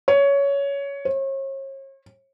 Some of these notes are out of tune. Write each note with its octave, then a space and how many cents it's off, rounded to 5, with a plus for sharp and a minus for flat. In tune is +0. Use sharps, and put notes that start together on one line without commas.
C#5 +15
C#5 -40